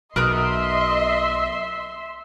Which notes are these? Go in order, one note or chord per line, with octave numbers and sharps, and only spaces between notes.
B1 B2 A#4 D#5 E5 C6 D#6 F#6